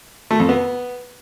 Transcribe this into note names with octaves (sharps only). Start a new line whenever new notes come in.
A3
F2
B3